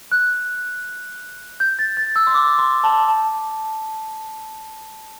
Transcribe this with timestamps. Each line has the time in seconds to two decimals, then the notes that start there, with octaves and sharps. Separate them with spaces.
0.12 F#6
1.60 G6
1.79 A6
1.97 A6
2.16 E6
2.27 C6
2.34 D6
2.58 C6
2.84 A5
3.08 A5